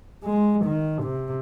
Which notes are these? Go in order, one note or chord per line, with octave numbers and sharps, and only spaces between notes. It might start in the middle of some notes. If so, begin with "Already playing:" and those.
G#3
D#3
C3